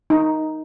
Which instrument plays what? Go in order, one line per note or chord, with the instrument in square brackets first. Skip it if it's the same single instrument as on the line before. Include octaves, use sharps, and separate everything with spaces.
[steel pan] D#4